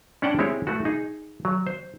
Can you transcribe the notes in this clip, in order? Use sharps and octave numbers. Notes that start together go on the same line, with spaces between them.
C#4 D4 C#5 F#5 G5 A5
G#3 C4 E4 G4 C#5
A3 E4 F#4
D#4 G#4
F#3
C5